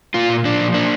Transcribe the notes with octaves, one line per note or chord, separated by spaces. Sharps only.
A#3 F4
A#2
A#2 D4
F3
A#3 D4